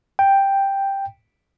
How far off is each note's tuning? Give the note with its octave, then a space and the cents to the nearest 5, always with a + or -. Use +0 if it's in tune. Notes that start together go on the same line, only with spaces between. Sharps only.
G5 +5